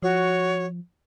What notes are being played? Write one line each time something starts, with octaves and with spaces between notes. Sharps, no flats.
F3 F#4 C#5